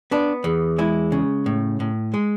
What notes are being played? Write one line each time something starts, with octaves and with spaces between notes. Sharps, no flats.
B3 D4
E2
G#3 E4
C#3
A2
A2
G#3